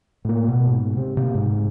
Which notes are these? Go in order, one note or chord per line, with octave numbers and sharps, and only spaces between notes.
A2 A#3
B2
G#2
C3
C3 A#3 C4
G#2